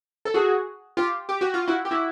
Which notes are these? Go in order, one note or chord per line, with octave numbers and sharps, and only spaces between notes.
A4
F#4 G#4
F4 G4
G4
F#4
F4
E4 F#4
G4
E4 F#4